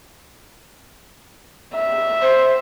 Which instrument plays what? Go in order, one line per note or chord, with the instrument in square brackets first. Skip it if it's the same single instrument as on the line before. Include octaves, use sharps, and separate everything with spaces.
[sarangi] E5
[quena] C5